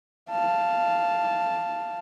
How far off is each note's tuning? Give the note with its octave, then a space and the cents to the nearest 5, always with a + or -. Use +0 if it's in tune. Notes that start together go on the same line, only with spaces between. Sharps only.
F5 -10 A5 +0